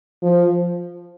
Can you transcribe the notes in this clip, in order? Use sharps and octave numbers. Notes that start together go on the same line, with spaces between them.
F3